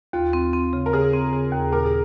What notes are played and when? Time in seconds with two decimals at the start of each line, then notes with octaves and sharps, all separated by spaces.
0.13 D#2 F4
0.33 C4
0.53 C4
0.73 C#3
0.86 A#4
0.93 C#3 G#4
1.13 C4
1.33 C#3
1.52 D#2
1.72 A#2 A#4
1.85 G#4